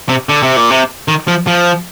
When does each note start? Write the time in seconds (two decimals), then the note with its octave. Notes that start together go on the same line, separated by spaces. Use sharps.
0.09 C3
0.29 D3
0.43 C3
0.56 A#2
0.70 C3
1.08 D#3
1.28 F3
1.47 F3